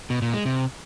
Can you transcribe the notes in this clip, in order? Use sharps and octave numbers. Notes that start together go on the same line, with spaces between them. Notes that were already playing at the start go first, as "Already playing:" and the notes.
B2
A#2
G#3
C3